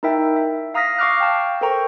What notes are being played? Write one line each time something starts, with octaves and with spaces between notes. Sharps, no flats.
D#4 E4 A#4 E5 G5
E5
F5 A#5 D#6 F6 A#6 B6
F5 C#6 D6 F6 F#6
G5 A5
A4 A#4 C5 G5 A#5 C#6